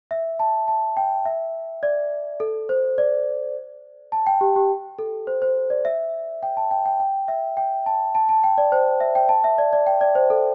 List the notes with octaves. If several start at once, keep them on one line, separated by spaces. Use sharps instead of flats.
E5
A5
A5
G5
E5
D5
A4
C5
D5
A5
G5
G4
G4
A4
C5
C5
D5
E5
G5
A5
G5
G5
G5
E5
G5
A5
A5
A5
G5
D5
C5
E5
G5
A5
E5
D5
D5
G5
D5
C5
A4